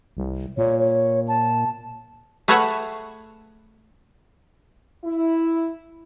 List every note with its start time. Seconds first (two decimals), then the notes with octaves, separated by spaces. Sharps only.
0.17 C2
0.57 A#2 C#5
0.79 C#5
1.28 A5
2.48 A3 G#4 B4 C#5 E5 F#5
5.04 E4